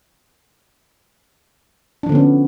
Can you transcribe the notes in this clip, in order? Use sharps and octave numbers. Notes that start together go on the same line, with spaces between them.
D3 F3 B3 C#4 D4